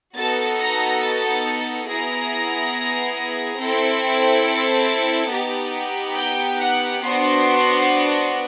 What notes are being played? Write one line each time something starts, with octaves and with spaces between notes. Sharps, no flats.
B3 D#4 F#4 A4 A5 A6
A#5 A#6
A5 A6
B3 E4 G#4 A#5 A#6
C4 E4 A4
A5 A6
B3 D#4 G4
G5 G6
F#5 F#6
B3 D4 F#4 C5 C6